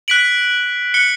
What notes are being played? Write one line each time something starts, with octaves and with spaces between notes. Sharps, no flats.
F#6 B6 D7 F#7
F#6 C#7 G7